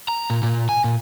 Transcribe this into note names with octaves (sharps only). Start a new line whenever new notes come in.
A#5
A#2
A#2
G#5
A#2